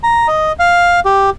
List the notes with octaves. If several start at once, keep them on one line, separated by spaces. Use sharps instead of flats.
A#5
D#5
F5
G4